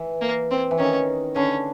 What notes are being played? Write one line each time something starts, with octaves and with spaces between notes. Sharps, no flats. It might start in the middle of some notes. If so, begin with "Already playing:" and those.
Already playing: E3
A#3
C4
E3
D#3 C#4
D3 C#4